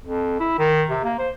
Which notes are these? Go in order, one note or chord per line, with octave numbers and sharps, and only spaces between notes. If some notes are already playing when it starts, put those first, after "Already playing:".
F2
E4
D#3
C3
A#3
C5